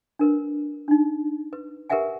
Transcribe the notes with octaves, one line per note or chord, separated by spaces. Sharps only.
D4 A#4 B4
D4 D#4
B4
G4 A#4 B4 E5 F#5 G#5